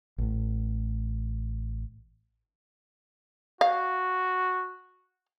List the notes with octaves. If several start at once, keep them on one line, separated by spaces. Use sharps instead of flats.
A1 A2
F#4 F5